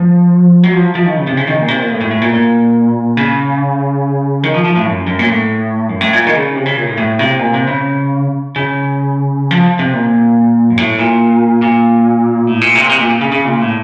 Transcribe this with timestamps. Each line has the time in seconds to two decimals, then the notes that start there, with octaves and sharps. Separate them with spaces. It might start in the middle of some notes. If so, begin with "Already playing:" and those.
Already playing: F3
0.63 F#3
0.73 F3
0.95 F3
1.06 D#3
1.16 C#3
1.27 C3
1.37 C#3
1.48 D#3
1.58 A#2
1.68 C3
1.79 A#2
1.90 A2
2.01 A2
2.11 A2
2.21 A#2
2.33 A#2
3.17 C#3
4.43 D#3
4.54 F3
4.65 F3
4.76 A2
4.87 F#2
5.07 F#2
5.19 A#2
5.28 A2
5.89 F#2
6.01 A2
6.13 A#2
6.26 D#3
6.35 C#3
6.55 C3
6.66 C#3
6.76 A#2
6.87 A2
6.98 A2
7.19 C3
7.39 A#2
7.54 C3
7.67 C#3
8.56 C#3
9.51 F3
9.79 C3
9.94 A#2
10.70 F#2
10.78 A2
10.99 A#2
11.62 A#2
12.47 A2
12.61 A#2
12.75 C3
12.85 A#2
12.89 C3
13.00 A#2
13.21 C#3
13.32 C#3
13.45 A#2
13.60 A2